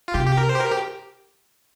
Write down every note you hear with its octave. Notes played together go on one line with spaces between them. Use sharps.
F4
C3 G4
G4
A#4
C5
G4
A#4
G4